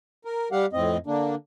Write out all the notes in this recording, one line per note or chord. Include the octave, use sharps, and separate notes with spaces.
A#4
G3 G4 F5 F#5
F2 A2 C4 D#5
D3 A#3 D4